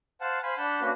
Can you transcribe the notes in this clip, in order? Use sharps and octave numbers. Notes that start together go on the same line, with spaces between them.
C5 F5 F#5 A5
C5 F5 G#5 B5
D4 F#5 A5 B5 G6
A#3 C#4 D4 F#4 B4